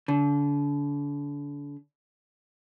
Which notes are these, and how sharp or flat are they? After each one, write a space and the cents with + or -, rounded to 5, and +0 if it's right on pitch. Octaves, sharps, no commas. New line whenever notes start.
D3 -35